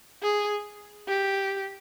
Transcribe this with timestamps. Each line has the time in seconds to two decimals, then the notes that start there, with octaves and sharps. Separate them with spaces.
0.23 G#4
1.08 G4